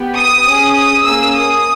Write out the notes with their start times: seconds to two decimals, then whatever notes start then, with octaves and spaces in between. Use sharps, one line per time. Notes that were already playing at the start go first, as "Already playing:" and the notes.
Already playing: B3 G4
0.16 D#6
0.45 C#4 G#4
0.76 D#6
1.05 A#3 C#4 G#4 E6
1.35 D#6